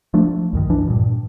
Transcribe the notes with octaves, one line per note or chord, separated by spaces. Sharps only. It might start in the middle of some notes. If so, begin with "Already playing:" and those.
F3 A3 D4
C2 F#2 D#3
E3 D4
G2 A#2